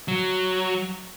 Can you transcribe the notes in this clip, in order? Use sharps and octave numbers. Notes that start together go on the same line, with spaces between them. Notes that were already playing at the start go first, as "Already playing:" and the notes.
F#3